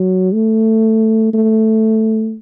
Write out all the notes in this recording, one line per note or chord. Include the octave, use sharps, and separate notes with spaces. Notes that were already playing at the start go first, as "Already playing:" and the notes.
Already playing: F#3
A3
A3